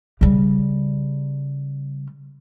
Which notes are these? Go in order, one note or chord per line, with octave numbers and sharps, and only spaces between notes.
C#3 G3